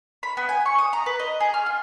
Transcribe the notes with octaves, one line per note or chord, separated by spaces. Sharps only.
B5
B3
G#5
C#6
D#6
A#5
B4
D#5
G#4
F6
F4